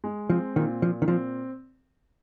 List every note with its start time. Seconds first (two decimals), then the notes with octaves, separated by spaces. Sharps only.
0.04 G#3
0.30 F3 C4
0.56 A#2 D#3
0.82 A#2 F3
1.02 D#3
1.08 F3 C4